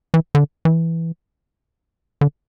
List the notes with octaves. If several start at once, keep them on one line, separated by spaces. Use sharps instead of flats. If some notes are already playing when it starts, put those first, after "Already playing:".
E3
D3
E3
D3